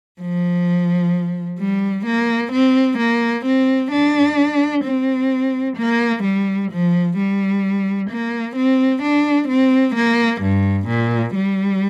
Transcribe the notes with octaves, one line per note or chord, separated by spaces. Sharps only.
F3
G3
A#3
C4
A#3
C4
D4
C4
A#3
G3
F3
G3
A#3
C4
D4
C4
A#3
G2
A#2
G3